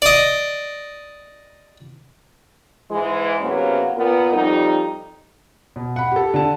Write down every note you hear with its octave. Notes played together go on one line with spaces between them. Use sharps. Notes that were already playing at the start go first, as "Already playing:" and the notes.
D5 D#5
G#2 E3 G#3
E2 C3 F#3 A#3 B3 C#4
A#2 B3 A#4
F2 G3 D#4
B2
F#5 B5
G4 A4
D3 A5